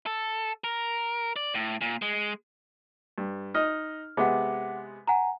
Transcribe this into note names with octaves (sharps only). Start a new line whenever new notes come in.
A4
A#4
D5
A2
A#2
G#3
G2
D#4 D#5 F6
C3 G#3 B3 F#5 D6
F#5 G#5 A#5